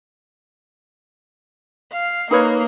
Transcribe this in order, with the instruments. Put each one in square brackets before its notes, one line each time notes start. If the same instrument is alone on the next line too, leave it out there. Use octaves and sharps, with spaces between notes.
[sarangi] F5
[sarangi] A#3 [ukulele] D#4 B4 C#5